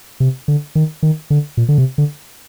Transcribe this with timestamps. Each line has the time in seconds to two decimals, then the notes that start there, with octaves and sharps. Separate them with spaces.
0.20 C3
0.48 D3
0.75 D#3
1.03 D#3
1.30 D3
1.57 A#2
1.69 D3
1.78 C3
1.98 D3